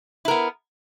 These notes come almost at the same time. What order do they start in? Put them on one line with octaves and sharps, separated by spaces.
E4 A#4 B3